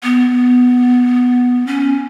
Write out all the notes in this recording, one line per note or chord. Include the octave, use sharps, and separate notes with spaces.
B3
C#4